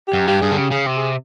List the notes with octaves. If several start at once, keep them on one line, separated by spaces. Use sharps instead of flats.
G4
F#2
G2 G4
G2 G#4
D3
C#3 G4
C#3 G#4
C3 G4
G#4